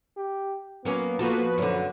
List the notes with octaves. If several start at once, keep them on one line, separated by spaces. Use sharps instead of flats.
G4
F#3 A#3 B3 C#4
F3 A#3 F#4 A4 B4
F#2 D3